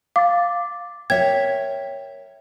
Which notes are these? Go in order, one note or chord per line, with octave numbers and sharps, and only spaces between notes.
F5 D6 A6
A#4 C#5 E5 G5 G#6